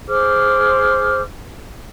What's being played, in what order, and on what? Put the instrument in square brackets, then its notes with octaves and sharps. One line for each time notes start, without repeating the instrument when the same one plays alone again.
[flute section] G#4 C5 D6 F6